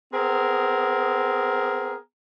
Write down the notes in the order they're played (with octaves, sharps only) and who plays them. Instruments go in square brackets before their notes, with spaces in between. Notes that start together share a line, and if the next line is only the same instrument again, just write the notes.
[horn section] B3 C4 G#4 A#4